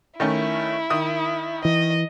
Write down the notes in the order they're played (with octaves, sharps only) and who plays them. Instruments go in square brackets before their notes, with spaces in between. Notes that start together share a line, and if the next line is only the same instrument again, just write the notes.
[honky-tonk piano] D#3 A3 C#4 [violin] E4
[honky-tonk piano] D#3 D#6
[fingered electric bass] E3 [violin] D#5